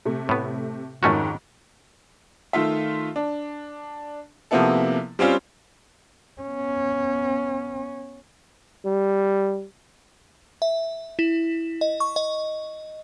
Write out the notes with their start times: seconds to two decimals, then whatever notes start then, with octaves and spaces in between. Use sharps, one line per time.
0.05 C3 A3
0.29 A2 B3
1.03 F2 G#2 D#3 A3 C#4 F#4
2.53 D#3 A3 F4 E5
3.16 D4
4.51 C3 F3 A#3 B3 E4 A4
5.19 G3 C4 C#4 F4
6.41 B3 C#4
8.85 G3
10.62 E5
11.19 E4
11.81 D#5
12.00 C#6
12.16 D#5